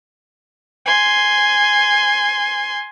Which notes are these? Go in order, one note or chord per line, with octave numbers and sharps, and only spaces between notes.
G#5 C6